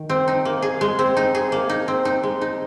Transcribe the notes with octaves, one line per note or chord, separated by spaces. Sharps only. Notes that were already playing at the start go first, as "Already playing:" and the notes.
Already playing: D#3
C4
D#4
A#3
G#4
G#3
C4
D#4
G#4
A#3
D#4
C4
D#4
G#3
D#4